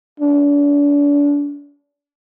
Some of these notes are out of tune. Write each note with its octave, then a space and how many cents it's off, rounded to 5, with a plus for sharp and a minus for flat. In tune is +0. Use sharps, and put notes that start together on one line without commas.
D4 -35